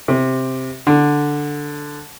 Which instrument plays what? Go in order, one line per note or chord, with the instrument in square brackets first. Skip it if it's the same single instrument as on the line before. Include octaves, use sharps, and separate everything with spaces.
[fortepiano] C3
D3